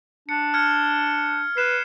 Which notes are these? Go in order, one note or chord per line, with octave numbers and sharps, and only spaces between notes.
D4 C#7
F6 G#6 C#7
B4 C7 E7